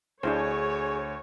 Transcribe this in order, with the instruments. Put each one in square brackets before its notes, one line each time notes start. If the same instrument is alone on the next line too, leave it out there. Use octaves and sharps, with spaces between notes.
[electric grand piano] D2 [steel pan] D4 E4 C5 [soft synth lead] G#4 [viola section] C#5